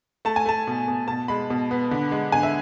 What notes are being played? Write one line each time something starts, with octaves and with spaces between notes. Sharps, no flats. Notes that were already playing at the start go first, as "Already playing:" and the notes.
A3 A5
G#5
A3 A5
B2
B2
B2 A5
G#3 B5
B2
B3
D3
G#3
D3 G#5
E5